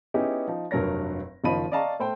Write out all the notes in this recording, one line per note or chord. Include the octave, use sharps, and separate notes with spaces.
B3 C#4 D#4 E4 G4 G#4
F3 D#4
F1 G2 F#3 A#4 C#5 A#6
F#1 D#3 F3 D#5 B5 D#7
D5 D#5 F5 A5 A#5 C#6
A3 C5 G5